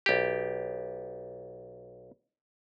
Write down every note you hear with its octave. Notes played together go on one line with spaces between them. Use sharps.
B1 G4